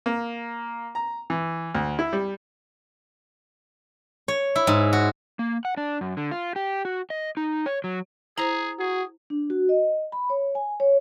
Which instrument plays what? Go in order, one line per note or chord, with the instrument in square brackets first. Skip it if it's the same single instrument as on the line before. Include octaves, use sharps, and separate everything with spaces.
[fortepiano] A#3
A#5
E3
D2
E4
G3
[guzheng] C#5
E4
G#2
F#4
[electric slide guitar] A#3
F#5
D4
F#2
D3
F4
G4
F#4
D#5
D#4
C#5
F#3
[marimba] E4 C5 [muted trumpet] G#4 [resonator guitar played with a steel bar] A#5
[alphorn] F#4 [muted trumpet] G#4
[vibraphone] D4
F#4
D#5
B5
C#5
G#5
C#5